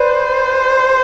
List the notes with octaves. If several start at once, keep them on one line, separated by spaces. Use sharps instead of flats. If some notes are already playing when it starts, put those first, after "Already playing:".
Already playing: B4 C5 D5